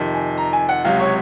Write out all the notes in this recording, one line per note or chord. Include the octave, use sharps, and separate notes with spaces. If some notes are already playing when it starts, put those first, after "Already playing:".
Already playing: F2 C3 D#3
G#5
A#5
G#5
F#5
C#2 C3 F#3 F5
C#5